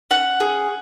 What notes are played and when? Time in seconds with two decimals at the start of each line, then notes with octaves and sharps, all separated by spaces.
0.11 C#4 F#5
0.40 G#4